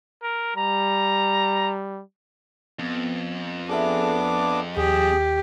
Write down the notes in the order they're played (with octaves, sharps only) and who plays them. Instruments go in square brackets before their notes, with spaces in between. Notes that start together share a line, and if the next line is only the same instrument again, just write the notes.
[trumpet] A#4
[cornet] G3 [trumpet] A#5
[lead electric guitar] F2 [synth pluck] B3
[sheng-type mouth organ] B3 D4 D6 [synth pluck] G#4 A4 E5
[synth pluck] D#2 [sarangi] G4 [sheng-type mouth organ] G#4